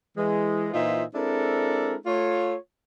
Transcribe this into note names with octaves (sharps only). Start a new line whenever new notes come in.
E3 G#3
A#2 E3 D#4 F4 C5 E5
G#3 C4 D4 E4 A4 A#4
A3 F4 C#5